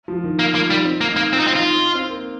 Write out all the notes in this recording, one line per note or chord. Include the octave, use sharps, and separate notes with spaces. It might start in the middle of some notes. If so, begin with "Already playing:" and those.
F3
D#3
A#3 D#4
A#3 F4
G3 D#4
C4
A#3
D#4
A#3
C4 F4
D#4
C4
D#4 F4
D#4
C4
A#3